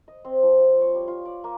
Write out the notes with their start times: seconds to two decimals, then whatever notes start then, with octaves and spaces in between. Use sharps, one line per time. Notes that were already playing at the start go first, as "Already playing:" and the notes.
0.08 D#5
0.25 C4
0.43 F3
0.60 F4
0.81 C#5
0.95 G3
1.08 F4
1.25 D5
1.44 A#3